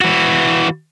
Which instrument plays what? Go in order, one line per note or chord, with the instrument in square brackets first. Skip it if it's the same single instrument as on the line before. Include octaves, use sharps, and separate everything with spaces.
[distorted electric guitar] E3 F#4